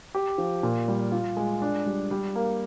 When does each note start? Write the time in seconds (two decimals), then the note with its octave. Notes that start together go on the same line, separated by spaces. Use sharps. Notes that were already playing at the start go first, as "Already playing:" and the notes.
0.15 G4
0.38 F3
0.63 A#2
0.88 G3
1.12 F4
1.37 G#3
1.62 D4
1.86 G3
2.11 G3
2.36 A#3